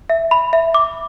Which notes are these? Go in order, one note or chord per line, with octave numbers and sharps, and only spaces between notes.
E5
B5
E5
D6